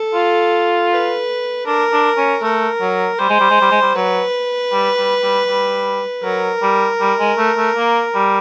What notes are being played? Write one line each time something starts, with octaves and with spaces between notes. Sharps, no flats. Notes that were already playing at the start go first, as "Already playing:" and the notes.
Already playing: A4
F4
B4
D4 A#4
D4
C#4
A3 A#4
F#3
G3 C5
G#3
G3
G#3
G3
G#3
G3
F#3 B4
G3
G3
G3
G3
F#3 A#4
G3
G3
G#3
A3
A3
A#3
G3